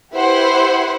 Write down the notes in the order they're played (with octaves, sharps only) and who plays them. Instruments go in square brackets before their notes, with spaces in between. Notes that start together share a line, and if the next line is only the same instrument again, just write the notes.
[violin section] E4 G4 B4 C5 F#5